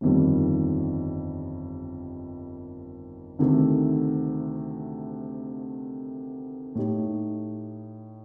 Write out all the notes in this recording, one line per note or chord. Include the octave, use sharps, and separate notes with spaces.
G1 F2 D#3 G3
D2 C3 D#3 A3
A2 A3 D#4 G4